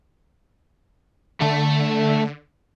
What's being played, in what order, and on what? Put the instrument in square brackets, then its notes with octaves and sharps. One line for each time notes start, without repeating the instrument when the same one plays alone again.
[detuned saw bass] D3 [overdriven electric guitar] A3 A4